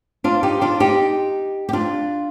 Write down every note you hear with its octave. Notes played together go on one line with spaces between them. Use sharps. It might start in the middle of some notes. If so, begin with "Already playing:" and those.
D4 F4
D#4 G4
D4 F4
D#4 G4
G4
D4 F4